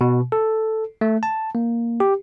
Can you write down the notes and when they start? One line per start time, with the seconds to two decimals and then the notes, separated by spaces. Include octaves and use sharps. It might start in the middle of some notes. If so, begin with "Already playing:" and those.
0.01 B2
0.32 A4
1.01 A3
1.23 A5
1.55 A#3
2.00 G4